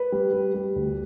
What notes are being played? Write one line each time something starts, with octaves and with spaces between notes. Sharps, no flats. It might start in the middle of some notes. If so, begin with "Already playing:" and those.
Already playing: B4
G3
G3
G3
D2